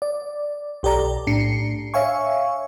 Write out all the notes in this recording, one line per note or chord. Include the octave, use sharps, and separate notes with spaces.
D5
B1 G4 A4 D5 A#5
A2 D4 C7 C#7
C#5 E5 F5 G#5 C#6